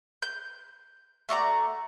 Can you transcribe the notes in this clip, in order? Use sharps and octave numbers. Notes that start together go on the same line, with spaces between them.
G6
A3 F#4 D5 A#5